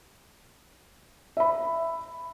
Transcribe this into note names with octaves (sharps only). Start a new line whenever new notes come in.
E5 B5